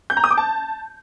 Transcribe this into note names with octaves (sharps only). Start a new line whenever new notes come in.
G6
A#5
D#6
D6
A5